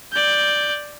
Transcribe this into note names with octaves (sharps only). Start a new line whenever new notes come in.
D5 G6